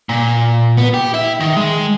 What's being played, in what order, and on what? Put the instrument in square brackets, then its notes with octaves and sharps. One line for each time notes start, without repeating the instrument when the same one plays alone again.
[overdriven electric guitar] A#2
B3
G4
E4 E5
D#3
G#3